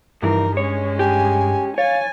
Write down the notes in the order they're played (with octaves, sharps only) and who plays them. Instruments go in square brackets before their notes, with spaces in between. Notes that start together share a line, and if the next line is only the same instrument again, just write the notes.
[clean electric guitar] C2 E3 F3 [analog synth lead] G2 [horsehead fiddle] D#4 A#4
[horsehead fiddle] G#3 C#4 [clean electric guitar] C#5
[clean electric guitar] G4 [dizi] G#5
[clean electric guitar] C#5 [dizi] F5 [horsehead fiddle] G#5 [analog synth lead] A6